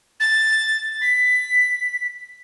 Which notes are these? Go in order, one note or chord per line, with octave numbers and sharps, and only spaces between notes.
A6
B6